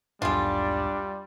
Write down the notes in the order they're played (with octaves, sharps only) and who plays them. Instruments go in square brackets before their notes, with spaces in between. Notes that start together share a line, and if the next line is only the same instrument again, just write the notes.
[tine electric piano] B1 E2 G#2 [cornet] G3 [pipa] G#3 F4 [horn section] D4